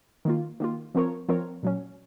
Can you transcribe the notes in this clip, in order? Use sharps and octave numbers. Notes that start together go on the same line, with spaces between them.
D#3 A#3 F4
D#3 A#3 F4
F3 C4 F4 A#4 C#5
F3 C4 F4 A#4 C#5
A#2 F#3 C#4